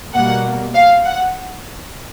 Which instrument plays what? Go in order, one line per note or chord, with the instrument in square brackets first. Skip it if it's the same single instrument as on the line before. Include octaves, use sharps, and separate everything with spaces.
[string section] B2 G3 A#3 F#5
F5
F#5